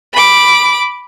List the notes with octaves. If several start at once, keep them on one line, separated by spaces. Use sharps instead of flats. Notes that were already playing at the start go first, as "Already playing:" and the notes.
B5 D6